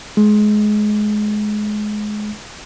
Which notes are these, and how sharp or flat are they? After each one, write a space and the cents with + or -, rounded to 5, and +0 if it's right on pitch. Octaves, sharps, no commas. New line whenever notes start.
G#3 +25